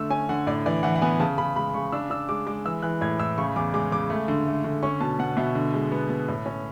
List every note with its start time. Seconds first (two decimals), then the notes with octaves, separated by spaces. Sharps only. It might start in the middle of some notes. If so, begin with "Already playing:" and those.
Already playing: D3 A3 E6
0.10 C#4 G#5
0.29 D3 F#5
0.47 A2 D5
0.66 E3 D5
0.83 E3 F#5
0.96 F#5
1.01 B3 G#5
1.20 C#3 A5
1.38 C#3 B5
1.56 G#3 B5
1.74 C#3 C#6
1.92 D4 E6
2.10 D4 E6
2.29 G#3 D6
2.47 G#3 D6
2.65 E3 E6
2.83 E3 F#6
3.01 A2 G#6
3.19 A2 E6
3.38 C#3 C#6
3.56 E2 D6
3.74 G#3 D6
3.92 C#3 D6
4.10 A3
4.28 D3
4.47 A3
4.64 D3
4.83 C#4 C#6
5.01 B2 A5
5.19 B2 F#5
5.37 B2 E5
5.55 D3
5.73 G#3
5.92 B3
6.10 B3
6.28 A2
6.46 C#4